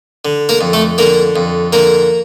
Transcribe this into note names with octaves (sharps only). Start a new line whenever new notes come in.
D3
A#3 A#4
F2
A3 A4
D3 A#3 A#4
F2
D3 A#3 A#4